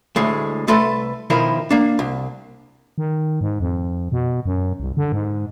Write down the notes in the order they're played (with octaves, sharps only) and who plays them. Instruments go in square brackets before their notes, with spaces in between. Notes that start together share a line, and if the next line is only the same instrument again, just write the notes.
[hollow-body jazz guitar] D2 A2 G#3
C2 A3 A4 B4 C6
B2 D#3 F3 E4 A#4
A#3 D4
C2
[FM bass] D#3
G#2
F2
B2
F#2
C2
D3
G#2